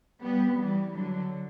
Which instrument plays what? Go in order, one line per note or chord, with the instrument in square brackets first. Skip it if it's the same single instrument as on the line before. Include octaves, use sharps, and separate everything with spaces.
[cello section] G3 B3
E3 G3
D3 F#3